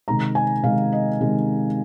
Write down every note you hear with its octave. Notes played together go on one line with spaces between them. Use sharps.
C3 D#3 G#3 A#5
G#5
C3 D#3 G#3 F5
D#5
C3 D#3 G#3